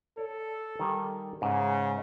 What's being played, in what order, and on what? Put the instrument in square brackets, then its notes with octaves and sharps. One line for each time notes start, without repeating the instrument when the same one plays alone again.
[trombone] A4 [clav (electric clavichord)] C#5 D5
[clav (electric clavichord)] D#3 G3 G#5
[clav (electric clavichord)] G#2 [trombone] C#3